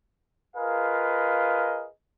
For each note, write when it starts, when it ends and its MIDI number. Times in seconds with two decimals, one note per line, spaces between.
0.57 1.87 65
0.57 1.87 68
0.57 1.87 70
0.57 1.87 71
0.57 1.87 75
0.57 1.87 77